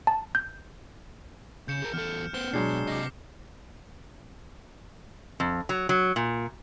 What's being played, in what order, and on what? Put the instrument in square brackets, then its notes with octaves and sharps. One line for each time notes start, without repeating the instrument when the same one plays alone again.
[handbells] A5
G6
[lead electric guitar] C#3 [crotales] G6 C#7 E7
[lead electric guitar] G#4 A#4
[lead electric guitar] E2 A4 [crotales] F6
[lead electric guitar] B3 C5 [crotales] E7 G7
[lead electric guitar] B2 [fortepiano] F#3 G#3 D4 [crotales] C7
[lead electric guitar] C3 D#5 [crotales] D6 A#6
[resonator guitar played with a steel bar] F2
F#3
F#3
A#2